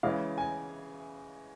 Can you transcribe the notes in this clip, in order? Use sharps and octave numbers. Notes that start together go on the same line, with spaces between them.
C#3 E3 G#3 F5
G#5